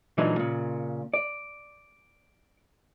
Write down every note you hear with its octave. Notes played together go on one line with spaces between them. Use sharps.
A#2 E3 F#3 G#3 D4 D#4
A#2 C#3
D5